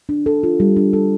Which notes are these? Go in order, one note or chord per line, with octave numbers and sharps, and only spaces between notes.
D4
A4
F4
G3
D4
A4